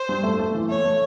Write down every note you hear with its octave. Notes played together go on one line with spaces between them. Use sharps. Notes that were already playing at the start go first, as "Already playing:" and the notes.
Already playing: C5
G2
A3
A3
E3
A3 C#5
A3